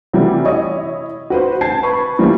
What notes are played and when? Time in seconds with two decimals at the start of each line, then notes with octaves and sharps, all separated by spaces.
0.13 C3 E3 F#3 G3 A3
0.45 E4 C#5 D#5
1.30 F#4 B4 C5
1.61 A5 G6 G#6 C7
1.83 B4 B5 C#6
2.19 E3 F3 G3 A#3